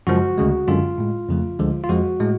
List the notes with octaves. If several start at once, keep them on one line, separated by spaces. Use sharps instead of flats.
F#2 C#3 F3 G#3 F#4
D2 C#3 G#3
F#2 D3 G#3 F4
A2 G#3
F2 C#3 F3 A3
D2 D3 F3 G#3
F4
F2 F3 G#3 F#4
A2 G#3